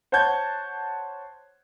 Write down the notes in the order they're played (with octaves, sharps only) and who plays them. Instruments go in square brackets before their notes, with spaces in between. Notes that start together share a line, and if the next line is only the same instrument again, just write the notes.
[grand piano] C5 C#5 F#5 A5 G6 G#6